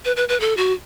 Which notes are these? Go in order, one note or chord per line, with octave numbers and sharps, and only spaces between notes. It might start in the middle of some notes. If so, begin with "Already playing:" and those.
B4
B4
B4
A4
F#4